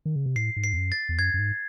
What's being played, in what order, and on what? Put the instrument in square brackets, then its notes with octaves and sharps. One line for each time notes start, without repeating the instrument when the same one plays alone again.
[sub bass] D#3
C#3
C3
[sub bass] A2 [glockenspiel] C7
[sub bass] G#2
[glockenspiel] C7
[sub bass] E2
F#2
[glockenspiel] A6
[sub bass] E2
[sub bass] F#2 [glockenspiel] G#6
[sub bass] F#2
G#2